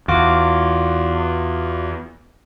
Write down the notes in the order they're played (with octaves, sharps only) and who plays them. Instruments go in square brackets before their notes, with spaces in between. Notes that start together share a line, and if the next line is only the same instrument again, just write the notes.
[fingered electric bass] E2 [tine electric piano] F4 F#4 D6